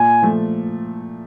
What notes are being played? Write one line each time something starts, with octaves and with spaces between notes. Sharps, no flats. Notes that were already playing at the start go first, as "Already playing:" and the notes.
Already playing: A#2 G#5
F3 A3